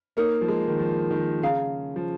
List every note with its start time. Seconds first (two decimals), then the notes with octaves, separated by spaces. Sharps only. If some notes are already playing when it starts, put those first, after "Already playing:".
0.17 A#3 D#4 A#4 C#5
0.41 F3
0.48 G#3
0.68 D#3
0.79 F3
1.11 D#3
1.42 C#3 G#4 F5 A#5
1.96 F3